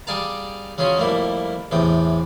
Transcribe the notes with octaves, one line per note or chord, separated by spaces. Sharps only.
G3 G#4 D5 F5 A5 A#5
C#3 F#3 C#4 F4 G#4
F2 G3 A3 A#3 E4
E2 A2 C3 G5